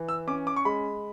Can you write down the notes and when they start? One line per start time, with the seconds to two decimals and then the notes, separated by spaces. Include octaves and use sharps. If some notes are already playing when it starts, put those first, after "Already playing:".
Already playing: E3
0.09 E6
0.27 C#4 D6
0.47 D6
0.56 C#6
0.65 G#3 B5